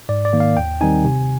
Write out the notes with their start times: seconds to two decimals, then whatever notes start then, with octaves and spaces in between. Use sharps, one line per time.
0.09 G#2 D5
0.25 D5
0.33 D#3 A#3
0.40 F5
0.57 D#2 G5
0.81 D#3 G3 C4 D#4 G#5
1.05 C3